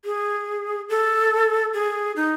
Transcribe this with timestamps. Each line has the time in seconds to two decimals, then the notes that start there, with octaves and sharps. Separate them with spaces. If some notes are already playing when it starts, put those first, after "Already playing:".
0.05 G#4
0.89 A4
1.74 G#4
2.16 D#4